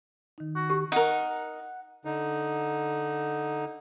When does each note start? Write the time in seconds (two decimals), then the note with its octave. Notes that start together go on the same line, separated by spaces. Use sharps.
0.38 D#3 D#4
0.55 F#4
0.70 G4
0.92 D#4 A#4 F#5
2.05 D3 D#4